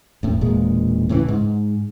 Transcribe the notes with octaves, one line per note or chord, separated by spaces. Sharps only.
E1 A2
E1 A#2 G#3
A2 C#3 E3
G#2